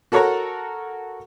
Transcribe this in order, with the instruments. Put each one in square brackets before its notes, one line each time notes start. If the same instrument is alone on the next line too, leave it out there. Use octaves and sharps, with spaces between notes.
[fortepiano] F#4 A4 A#4 C#5 F#5 A#5